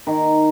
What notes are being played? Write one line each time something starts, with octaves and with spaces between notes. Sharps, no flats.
D#3